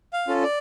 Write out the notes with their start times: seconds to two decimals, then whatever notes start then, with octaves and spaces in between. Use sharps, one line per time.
0.13 F5
0.28 C#4 F4 A4
0.43 D5